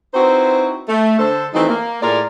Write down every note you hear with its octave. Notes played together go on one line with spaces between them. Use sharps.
C4 D#4 E4 F#4 B4 C5
A3
D3 A4 C5
E3 F#3 A3 C4 D#4
A#3
A2 F4 G#4 A#4 D5